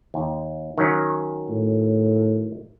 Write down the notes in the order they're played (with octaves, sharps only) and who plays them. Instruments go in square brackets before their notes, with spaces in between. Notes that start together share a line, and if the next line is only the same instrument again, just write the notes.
[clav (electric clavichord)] D#2
D#3 F#3 C#4
[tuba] A2